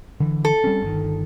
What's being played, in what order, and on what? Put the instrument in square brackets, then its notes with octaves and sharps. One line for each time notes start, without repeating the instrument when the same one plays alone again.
[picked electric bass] D3 E3
[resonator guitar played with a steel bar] A4
[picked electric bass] G3 C4 C#4
G1 D#3